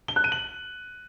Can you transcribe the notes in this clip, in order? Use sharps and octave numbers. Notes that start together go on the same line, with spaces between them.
G7
F#6
D#7
F#7